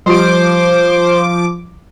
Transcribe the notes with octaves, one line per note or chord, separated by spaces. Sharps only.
F3 G3 F4 G4 C5 D6